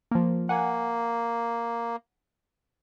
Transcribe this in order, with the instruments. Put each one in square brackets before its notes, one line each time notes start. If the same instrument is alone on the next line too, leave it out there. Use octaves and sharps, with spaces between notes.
[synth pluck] F3 A#3
[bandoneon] A#3 [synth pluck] F#5 G#5